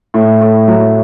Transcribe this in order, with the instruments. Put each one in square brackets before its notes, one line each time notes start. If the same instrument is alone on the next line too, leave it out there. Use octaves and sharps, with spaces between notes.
[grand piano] A2
A2
F#3